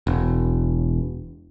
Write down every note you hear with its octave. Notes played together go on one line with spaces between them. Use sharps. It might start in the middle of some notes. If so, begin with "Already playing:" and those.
E1